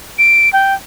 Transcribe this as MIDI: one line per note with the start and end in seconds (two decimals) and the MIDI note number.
0.18 0.51 98
0.53 0.74 79